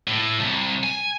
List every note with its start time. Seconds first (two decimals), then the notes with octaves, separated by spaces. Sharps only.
0.08 A2
0.40 C2
0.84 G#5